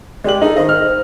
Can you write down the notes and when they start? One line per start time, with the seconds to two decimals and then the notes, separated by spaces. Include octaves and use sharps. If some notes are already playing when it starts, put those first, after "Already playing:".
0.24 G#3 G4 D5 F#7
0.42 D#4 G#4 A4
0.56 D#3 C5 D#5
0.69 F6